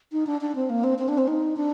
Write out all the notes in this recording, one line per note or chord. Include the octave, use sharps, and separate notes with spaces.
D#4
D4
D4
C4
A#3
C4
C4
D4
C4
D#4
D4